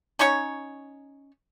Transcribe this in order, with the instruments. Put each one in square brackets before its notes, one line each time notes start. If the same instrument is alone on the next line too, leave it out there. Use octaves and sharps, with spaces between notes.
[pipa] C#4 D#4 C#5 C#6